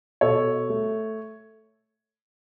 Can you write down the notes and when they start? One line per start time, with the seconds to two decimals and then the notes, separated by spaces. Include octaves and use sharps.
0.21 B2 A4 C#5
0.70 A3